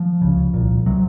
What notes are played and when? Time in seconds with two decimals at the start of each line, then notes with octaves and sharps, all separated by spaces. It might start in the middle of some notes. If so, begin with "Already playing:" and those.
Already playing: F3
0.22 C#2 C#3
0.54 C2 A#2
0.86 C3 F#3